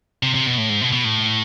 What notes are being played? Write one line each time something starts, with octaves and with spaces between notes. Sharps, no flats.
C3
C3
B2
A2
G#2
B2
B2
A2